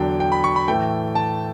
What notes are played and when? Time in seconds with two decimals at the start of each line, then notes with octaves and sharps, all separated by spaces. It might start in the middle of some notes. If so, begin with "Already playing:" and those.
Already playing: E2 D3 F#3 G5
0.20 G5
0.32 B5
0.44 C#6
0.56 B5
0.68 A2 E3 A3 G5
1.15 A5